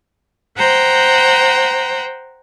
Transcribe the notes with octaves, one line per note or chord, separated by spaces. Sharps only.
C5 F#5 G5 A#5